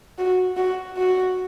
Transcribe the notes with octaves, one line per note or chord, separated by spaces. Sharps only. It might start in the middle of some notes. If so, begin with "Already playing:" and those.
F#4
F#4
F#4